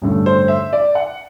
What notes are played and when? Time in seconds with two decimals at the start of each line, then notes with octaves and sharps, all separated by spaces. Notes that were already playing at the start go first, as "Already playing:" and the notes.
0.02 A1 G2 D3 A3
0.26 C5
0.48 E5
0.73 D5
0.95 F#5